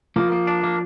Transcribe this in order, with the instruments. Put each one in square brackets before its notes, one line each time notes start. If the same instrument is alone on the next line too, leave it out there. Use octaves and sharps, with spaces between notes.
[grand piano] F3 [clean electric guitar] A#3
[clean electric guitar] A#3
D4
A#3